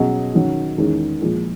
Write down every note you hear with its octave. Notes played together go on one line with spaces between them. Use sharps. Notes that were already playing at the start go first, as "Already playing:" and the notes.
Already playing: B2 F#3 C#4 G#4 D#5
D#3 F#3 C#4
E2 D#3 G#3 C#4
A#1 A#2 G#3